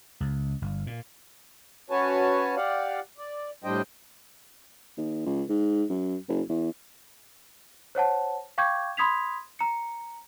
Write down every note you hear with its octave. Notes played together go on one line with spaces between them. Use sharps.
C#2
G1
A#2
C#4 F#4 B4 C#5 G#5 A5
G4 D5 F5 F#5
D5
A2 G3 D4 C5 D#5 G5
D#2
C#2
G#2
F#2
F#1
E2
C5 C#5 F#5 A5
F5 G5 C#6 D6 G6 G#6
B5 C6 D#6 G#6 B6 F7
A#5 C#7